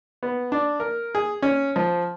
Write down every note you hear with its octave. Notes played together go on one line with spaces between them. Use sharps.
B3
D4
A#4
G#4
C#4
F3